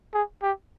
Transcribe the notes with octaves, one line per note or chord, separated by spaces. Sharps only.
G#4
G4